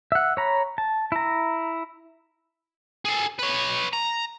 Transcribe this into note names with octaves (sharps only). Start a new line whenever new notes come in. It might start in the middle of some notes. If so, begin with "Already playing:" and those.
E5 F#5
C#5 A#5 B5
A5
E4 A#5
G#4 A4
B4 C#5
A#5